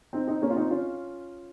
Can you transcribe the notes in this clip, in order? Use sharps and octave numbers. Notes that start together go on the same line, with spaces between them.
C4 D#4
C4 D#4
A#3 C#4
F4
C4 D#4
C#4 F4